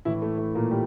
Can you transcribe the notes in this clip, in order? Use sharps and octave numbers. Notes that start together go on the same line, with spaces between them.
A2 E3 E4
A3
A3
A#2 A#3
G3 G4